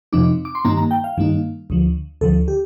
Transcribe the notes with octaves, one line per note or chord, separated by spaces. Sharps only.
F2 C3 F3 C4 D#4 D6
D6
C6
G2 D#3 G3 A#3 D#4 A#5
A#5
G5
F5
G2 D#3 G3 A#3 D#4
D2 D3 F3
D2 D3 F3 A4
G4